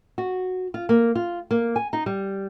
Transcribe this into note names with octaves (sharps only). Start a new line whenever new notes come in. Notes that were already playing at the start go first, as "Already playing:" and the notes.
F#4
F4
A#3
F4
A#3
G#5
D#4
G3